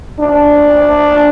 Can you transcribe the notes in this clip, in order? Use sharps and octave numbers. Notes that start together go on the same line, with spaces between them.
D4